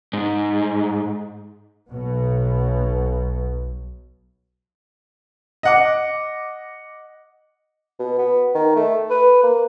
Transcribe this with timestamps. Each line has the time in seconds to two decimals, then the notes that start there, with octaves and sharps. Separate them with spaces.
0.13 G#2
1.90 B1 B2
5.63 D#5 F#5 D6
7.99 B2
8.18 B3
8.55 D#3
8.76 A3
9.10 B4
9.43 A#3